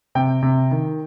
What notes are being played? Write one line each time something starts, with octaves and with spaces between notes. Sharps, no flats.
C3 G5
C3
D#3